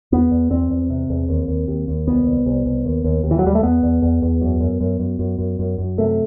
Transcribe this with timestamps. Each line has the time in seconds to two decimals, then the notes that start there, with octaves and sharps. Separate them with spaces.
0.12 E2 B3
0.31 E2
0.50 E2 C4
0.71 E2
0.90 C3
1.10 E2
1.29 D#2
1.48 D#2
1.68 D#2
1.88 D#2
2.07 C2 B3
2.27 C2
2.46 C2
2.66 C2
2.85 D#2
3.04 D#2
3.24 D#2
3.31 E3
3.39 F#3
3.44 D#2 G3
3.55 A3
3.63 E2 B3
3.83 E2
4.02 E2
4.22 E2
4.41 F#2
4.60 F#2
4.80 F#2
5.00 F#2
5.19 F#2
5.38 F#2
5.59 F#2
5.78 F#2
5.98 C3 A3